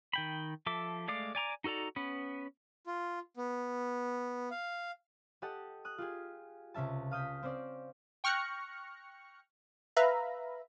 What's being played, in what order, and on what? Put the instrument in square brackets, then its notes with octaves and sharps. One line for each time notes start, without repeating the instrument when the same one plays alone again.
[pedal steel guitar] D#3 G5 B5
F3 A4 E5 D6
G#3 A3 D5 F5 D6
D5 G#5 A#5 D6
D#4 F#4 A4 D5 A#5
B3 C#4 B4
[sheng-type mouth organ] F4
B3
F5
[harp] G4 A4 D#5 F#5 A5
D#6 F#6
F4 G4 G#4
C#2 C3 C#4 E5 A5
F5 D#6 G6 B6
C4 C#4 C5 D5
[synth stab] G5 C#6 F6 F#6 A#6 C#7
B4 E5 F5 A#5 B5